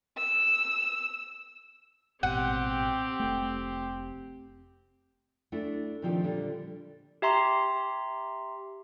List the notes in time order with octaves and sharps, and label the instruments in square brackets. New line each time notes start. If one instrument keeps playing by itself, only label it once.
[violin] E6
[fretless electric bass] A1 G#2 B2 [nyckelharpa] C4 G4 [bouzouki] F#5
[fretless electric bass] F1 A3
[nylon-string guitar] A3 D4 E4 F#5
A#2 D#3 F3 C4 G4
A#2 D3 G3
[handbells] G4 E5 A#5 C6